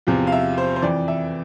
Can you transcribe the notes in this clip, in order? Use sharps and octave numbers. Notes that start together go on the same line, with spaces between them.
E2 C3 F3
F5
E5
C5
C5
F2 E3 D5
E5